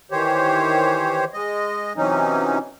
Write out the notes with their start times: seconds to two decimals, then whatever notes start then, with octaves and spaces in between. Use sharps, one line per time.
0.11 D#3 E3 G4 C5 C#5
1.33 G#3 D#5
1.97 C3 E3 F#3 C#4 D#4